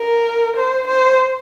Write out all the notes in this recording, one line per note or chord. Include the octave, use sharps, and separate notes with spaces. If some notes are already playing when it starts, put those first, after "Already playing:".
Already playing: A#4
C5
C5